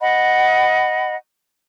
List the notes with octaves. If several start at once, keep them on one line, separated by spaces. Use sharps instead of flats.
D#5 F#5 B5